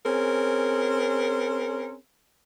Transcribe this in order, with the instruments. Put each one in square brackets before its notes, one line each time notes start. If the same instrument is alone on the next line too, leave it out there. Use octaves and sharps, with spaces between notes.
[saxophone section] C4 C#4 G#4 A#4